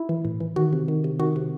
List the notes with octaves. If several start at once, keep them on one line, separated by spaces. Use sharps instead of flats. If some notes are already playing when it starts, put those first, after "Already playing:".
Already playing: E4
E3
A2
E3
D#3 F#4
C3
D#3
C3
D#3 F#4
C3